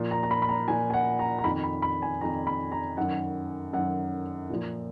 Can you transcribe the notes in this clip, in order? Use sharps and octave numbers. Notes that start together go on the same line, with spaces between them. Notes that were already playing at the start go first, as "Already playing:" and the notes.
Already playing: A#2 F3
A#5
A#5
B5
B5
A#5
A#2 F3 G#5
G#5
F#5
A#5
A#5
F2 D#3 B5
B5
B5
G#5
F2 D#3 A#5
B5
A#5
F#2 D#3 F#5
F#2 D#3 F#5
A#2 F3